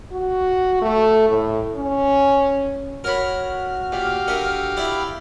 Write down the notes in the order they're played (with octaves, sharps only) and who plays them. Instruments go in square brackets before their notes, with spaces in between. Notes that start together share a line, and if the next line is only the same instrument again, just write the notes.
[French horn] F#4
A3
A2
C#4
[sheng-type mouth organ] F#4 [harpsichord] A#4 C#5 B5 [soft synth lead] F6
[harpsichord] A#2 [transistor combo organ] G4 F5
[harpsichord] D3 A#4 E5
[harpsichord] E4 D5 [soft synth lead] B5